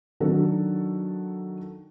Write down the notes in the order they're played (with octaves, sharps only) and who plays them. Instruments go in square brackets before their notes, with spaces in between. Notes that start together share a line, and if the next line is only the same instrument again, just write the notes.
[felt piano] D#3 F#3 D4 F#4 A4